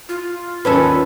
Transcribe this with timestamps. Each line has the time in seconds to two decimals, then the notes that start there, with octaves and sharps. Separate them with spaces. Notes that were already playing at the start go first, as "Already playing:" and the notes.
0.09 F4
0.65 D#2 C#4 A4 B4